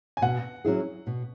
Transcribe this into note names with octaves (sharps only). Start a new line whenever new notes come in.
G#5
B2 F#5
F#3 C#4 E4 G#4
B2